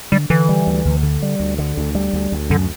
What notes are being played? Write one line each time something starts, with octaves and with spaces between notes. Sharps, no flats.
D3 G3
D3 E3
G3
D2
D2
D3
G3
D2
D3
D2
G3
D2
D2
F#2 D3